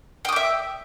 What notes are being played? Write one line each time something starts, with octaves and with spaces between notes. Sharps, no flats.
E5 G5 D6 D#6